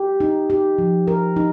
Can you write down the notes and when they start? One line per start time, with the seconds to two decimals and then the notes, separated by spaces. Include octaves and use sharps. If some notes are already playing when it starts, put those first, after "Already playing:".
Already playing: G4
0.20 D#4
0.50 G4
0.78 F3
1.07 A#4
1.36 D#4